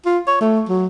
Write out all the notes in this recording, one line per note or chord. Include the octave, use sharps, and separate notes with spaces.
F4
C#5
A3
F#3